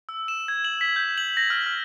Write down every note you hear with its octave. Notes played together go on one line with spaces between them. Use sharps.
E6
E7
G#6
F#7
B6
G6
F#7
A#6
F6
F6